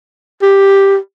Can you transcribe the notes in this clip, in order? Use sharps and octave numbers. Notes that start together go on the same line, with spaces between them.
G4